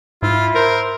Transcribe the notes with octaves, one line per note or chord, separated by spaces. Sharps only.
G#2 E4 F4
A#4 C5